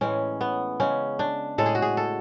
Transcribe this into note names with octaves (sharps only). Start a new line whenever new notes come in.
A2 E3 G#3 C#4
B3
C#3 G#3 C#4
D4
A2 G#3 A4
G#4
F#4
G#4
A4